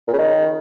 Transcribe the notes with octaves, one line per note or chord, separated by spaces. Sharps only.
A#2
C#3
D#3